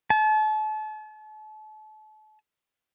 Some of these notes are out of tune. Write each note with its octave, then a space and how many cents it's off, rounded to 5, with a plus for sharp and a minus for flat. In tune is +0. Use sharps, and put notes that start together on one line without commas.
A5 -35